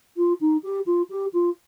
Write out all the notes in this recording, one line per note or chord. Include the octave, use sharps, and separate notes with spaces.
F4
D#4
G4
F4
G4
F4